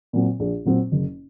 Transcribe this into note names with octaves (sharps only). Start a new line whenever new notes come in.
A#2 F#3 C4
A#1
A#2 F#3 C4
F#1